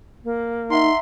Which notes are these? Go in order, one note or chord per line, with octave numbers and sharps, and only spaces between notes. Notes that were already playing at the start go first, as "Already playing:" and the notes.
A#3
D#4 E5 F#5 A#5 C6